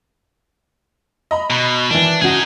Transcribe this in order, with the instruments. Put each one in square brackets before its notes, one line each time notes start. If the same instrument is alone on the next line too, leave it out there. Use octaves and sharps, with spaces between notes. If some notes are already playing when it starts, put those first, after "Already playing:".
[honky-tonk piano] D#5 A#5 B5
[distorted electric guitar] B2
[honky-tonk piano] D#3 E3 [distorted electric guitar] D4
[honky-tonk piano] C#3 F#4 [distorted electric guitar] D#4 G#4